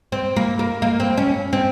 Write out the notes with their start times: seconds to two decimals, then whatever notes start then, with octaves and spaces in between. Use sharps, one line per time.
0.12 C4
0.36 A#3
0.59 A#3
0.82 A#3
1.00 C4
1.18 C#4
1.53 C4